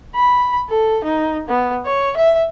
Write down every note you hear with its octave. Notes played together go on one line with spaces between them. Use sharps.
B5
A4
D#4
B3
C#5
E5